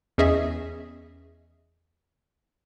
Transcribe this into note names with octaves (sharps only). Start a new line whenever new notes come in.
E2 C#4 G#4 D#5 E5